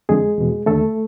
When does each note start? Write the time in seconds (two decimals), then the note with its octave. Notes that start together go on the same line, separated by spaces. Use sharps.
0.09 F2 D3 G#3 G#4
0.38 E2 B2
0.66 D#2 D3 A3 A4